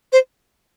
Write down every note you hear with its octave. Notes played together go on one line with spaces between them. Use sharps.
C5